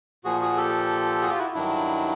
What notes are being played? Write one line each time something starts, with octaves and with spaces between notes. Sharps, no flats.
A#2 F3 F#4 G#4
F#4 G#4
G4 A4
F#4 G#4
F4 G4
E4 F#4
G2 D#3 F#3 D4 E4